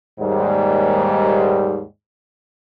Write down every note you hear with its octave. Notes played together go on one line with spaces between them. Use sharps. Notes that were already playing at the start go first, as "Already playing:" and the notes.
D#2 G#2 G3